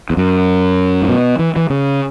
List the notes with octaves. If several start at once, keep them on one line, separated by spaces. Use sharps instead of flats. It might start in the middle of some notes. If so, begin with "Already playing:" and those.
E2
F#2
G#2
B2
E3
E3
C#3